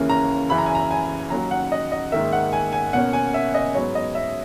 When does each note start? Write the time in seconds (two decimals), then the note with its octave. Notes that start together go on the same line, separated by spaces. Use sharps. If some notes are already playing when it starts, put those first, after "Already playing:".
Already playing: D#2 C#3 E3 A#3 C#4
0.10 A#5
0.49 F#2 C#3 E3 B5
0.58 A#5
0.66 G#5
0.75 A#5
0.91 G#5
1.30 D#2 D#3 F#3 C#4 A#5
1.51 F#5
1.72 D#5
1.92 D#5
2.12 G#2 D#3 A#3 E5
2.33 F#5
2.53 G#5
2.73 G#5
2.93 B2 A#3 C#4 F#5
3.13 G#5
3.34 E5
3.54 D#5
3.74 G#2 F#3 B3 C#5
3.95 D#5
4.15 E5